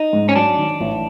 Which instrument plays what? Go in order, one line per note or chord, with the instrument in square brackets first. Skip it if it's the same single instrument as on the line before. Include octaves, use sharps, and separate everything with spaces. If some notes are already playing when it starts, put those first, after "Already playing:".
Already playing: [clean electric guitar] D#4
[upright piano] G#2
[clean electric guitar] C#4
[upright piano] F#3 [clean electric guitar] D4
[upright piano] D#3
A1